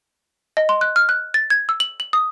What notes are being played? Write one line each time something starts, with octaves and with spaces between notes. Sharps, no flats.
D#5
C6
F#6
F6
F#6
A6
G#6
E6
F#7
F#7
D#6